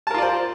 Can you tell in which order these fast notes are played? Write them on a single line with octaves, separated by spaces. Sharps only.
A5 A#4 F4 D5 C5